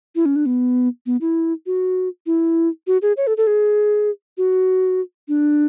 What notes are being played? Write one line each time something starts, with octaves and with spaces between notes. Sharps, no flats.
E4
C#4
D4
B3
B3
E4
F#4
E4
F#4
G#4
C#5
A4
A4
G#4
F#4
D4